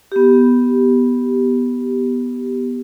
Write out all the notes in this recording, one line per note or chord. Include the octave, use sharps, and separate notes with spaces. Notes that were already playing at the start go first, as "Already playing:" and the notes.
B3 G4